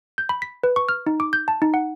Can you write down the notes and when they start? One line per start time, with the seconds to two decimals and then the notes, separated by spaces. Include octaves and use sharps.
0.18 G6
0.29 B5
0.42 B6
0.64 B4
0.76 C#6
0.89 F6
1.07 D#4
1.20 D6
1.33 G6
1.48 A5
1.62 D#4
1.74 F#5